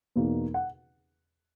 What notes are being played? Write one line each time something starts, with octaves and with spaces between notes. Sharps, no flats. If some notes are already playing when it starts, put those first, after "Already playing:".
E2 B2 A#3 D#4
F#5